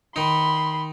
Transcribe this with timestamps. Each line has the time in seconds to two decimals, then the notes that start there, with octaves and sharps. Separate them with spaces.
0.16 D#3 D#4 B5 C6